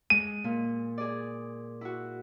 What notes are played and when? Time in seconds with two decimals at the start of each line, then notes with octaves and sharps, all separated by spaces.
0.10 G#3 D#7
0.44 A#2
0.98 G#4 D5
1.81 E4 F#4